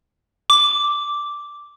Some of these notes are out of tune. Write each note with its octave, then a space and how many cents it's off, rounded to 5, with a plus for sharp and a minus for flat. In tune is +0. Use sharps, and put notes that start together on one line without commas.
D6 -5